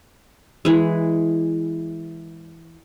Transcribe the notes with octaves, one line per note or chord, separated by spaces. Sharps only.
E3 G#3